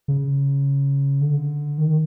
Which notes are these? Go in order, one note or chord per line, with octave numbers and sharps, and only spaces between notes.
C#3
D3
D#3